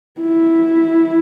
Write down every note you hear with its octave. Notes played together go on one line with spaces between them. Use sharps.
E4